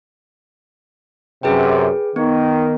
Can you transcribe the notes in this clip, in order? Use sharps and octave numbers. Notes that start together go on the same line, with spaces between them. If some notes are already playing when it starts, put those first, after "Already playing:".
F#2 C3 G#4 B4 G5
D#3 B3